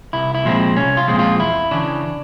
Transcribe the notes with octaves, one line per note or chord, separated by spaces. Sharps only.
C2 E4
E4
A#2 F3 G#3 C4
C2 C#4
F4
A#2 F3 G#3 C4
F4
E2 E4
C#3 E3 D4